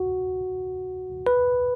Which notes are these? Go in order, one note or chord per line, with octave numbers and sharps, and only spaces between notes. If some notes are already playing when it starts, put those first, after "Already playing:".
Already playing: F#4
B4